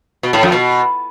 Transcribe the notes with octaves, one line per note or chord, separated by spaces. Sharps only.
B2
A2
F2
B2